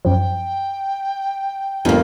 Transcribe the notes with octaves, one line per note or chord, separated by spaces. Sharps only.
F#2 F3 G5
G1 F2 A#3